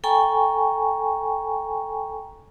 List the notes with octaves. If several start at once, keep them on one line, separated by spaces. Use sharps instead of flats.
A4 G5 G#5 A#5 C#6